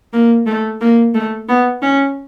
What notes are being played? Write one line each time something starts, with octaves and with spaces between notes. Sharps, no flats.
A#3
A3
A#3
A3
B3
C#4